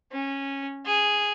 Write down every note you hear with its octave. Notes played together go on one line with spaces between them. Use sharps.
C#4
G#4